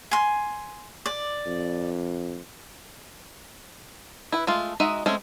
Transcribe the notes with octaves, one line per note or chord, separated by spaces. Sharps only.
G#5 C6
D5
F2
E4 B4
G#3 A3 F4
G#3 D#4 F#4 E5
G#3 A3 C4 C#4